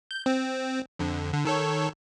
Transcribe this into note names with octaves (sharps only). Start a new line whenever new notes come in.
G6
C4
F2 D3
D3
D#3 A4 C#5